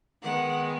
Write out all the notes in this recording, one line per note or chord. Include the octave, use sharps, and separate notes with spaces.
D#3 G#3 B3 F#5